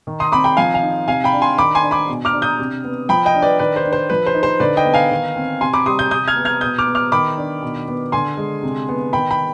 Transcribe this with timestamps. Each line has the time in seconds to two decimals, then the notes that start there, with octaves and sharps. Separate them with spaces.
0.07 D#3
0.20 C6 D#6
0.32 C4 B5 D6
0.44 G5 B5
0.57 F3 F5 G#5
0.74 F5 G#5
0.82 D#4
1.07 C3 F5 G#5
1.24 G5 B5
1.33 D4
1.42 G#5 C6
1.58 D#3 B5 D6
1.75 G#5 C6
1.83 D4
1.91 B5 D6
2.09 B2
2.25 D6 F6
2.33 D4
2.42 D#6 G6
2.59 C3
2.84 B3
3.09 F3 G5 B5
3.25 D#5 G5
3.35 D4
3.42 B4 D5
3.59 D#3 B4 D5
3.76 C5
3.84 D4
3.93 C5
4.10 F3 B4
4.27 C5
4.35 D#4
4.43 C5
4.60 D3 B4 D5
4.77 D#5 G5
4.85 B3
4.93 F5 G#5
5.11 D#3
5.36 C4
5.61 C3 G#5 C6
5.74 B5 D6
5.86 G3 C6 D#6
5.99 D#6 G6
6.11 C3 D#6 G6
6.28 F6 G#6
6.37 B3
6.45 F6 G#6
6.61 B2 D#6 G6
6.79 D6 F6
6.87 B3
6.95 D6 F6
7.12 D#3 B5 D6
7.38 D4
7.62 B2
7.88 B3
8.12 D3 G#5 C6
8.37 G#3
8.63 C3
8.89 B3
9.13 D#3 G5 B5
9.31 G5 B5